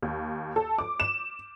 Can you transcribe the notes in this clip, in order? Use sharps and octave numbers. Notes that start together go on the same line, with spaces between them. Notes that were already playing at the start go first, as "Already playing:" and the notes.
D#2
A4
D6
E7